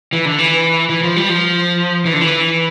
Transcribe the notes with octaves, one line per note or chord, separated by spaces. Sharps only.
E3
D3
E3
E3
F3
G3
F3
E3
D3
E3